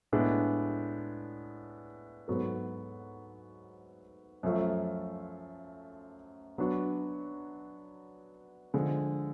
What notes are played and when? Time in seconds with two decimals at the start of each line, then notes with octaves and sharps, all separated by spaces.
0.12 A2 G#3 B3 D4
2.28 G#2 F#3 B3 F#4 A4
4.43 F#2 F3 A3 F4
6.58 F#3 B3 D4 F#4
8.74 D3 F3 G#3